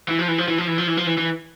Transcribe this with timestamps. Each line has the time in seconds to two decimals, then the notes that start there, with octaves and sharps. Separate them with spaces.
0.08 E3
0.19 F3
0.28 E3
0.38 F3
0.48 E3
0.58 F3
0.67 E3
0.78 F3
0.87 E3
0.97 F3
1.07 E3
1.18 E3